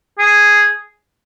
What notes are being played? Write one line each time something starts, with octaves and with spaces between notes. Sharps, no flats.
G#4